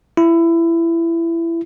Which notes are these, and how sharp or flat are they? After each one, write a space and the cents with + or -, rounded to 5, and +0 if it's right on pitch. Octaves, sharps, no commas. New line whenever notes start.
E4 +20